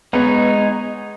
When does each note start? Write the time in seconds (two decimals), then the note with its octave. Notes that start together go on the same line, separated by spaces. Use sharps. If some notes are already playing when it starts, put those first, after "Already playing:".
0.13 G#3 B3 D#4 G#4 C#5